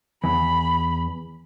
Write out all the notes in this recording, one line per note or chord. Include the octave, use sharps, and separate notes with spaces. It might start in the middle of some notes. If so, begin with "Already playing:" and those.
E2 B5